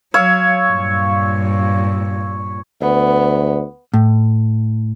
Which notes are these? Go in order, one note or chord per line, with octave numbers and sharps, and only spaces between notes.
F#3 C#5 F5 E6
G2 A#2
D2 B3
A2